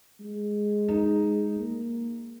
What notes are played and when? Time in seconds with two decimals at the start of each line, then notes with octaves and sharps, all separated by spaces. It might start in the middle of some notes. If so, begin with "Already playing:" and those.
0.20 G#3
0.88 D#4
1.58 A#3